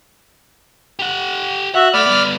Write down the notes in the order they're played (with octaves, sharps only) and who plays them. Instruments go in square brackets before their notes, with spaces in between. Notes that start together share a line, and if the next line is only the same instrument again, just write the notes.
[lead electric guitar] G4 F#5
[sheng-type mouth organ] F#4 E5 [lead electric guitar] F#5
[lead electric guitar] A3 [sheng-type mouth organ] D5 B5 F6
[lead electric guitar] G3 B3